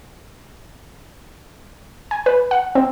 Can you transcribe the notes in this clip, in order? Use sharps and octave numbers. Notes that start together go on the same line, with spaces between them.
G#5
B4
F#5
C4